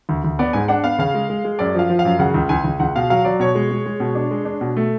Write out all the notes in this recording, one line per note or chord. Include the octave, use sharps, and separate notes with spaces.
D2
D2
B3 D5
G#2 G#5
D4 F#5
B3 F5
C#3 F5
G#3
G#3
G#3
F#2 D5
F3 F5
F3
F5
F#2
C#3 F#5
C#2
C#2 G#5
C#2
C#2 F#5
B2 F5
F#3 F5
F#3 D5
B2 C#5
G#3
G#3
G#3
B2
D4
G#3
D4
B2
A3